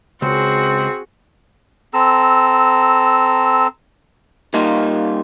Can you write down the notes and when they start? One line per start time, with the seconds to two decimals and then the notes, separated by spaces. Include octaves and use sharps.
0.22 C#2 C4 F#4 G#4
1.94 C4 A4 A#5 E6
4.54 G3 A#3 D#4 F4